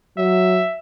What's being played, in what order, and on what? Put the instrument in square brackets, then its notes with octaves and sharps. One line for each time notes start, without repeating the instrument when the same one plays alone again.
[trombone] F#3 [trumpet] E5